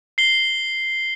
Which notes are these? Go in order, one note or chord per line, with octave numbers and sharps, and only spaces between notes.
C7 G7